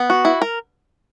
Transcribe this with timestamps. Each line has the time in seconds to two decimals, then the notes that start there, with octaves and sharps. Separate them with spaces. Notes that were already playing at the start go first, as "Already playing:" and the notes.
Already playing: B3
0.10 F#4
0.25 E4
0.42 A#4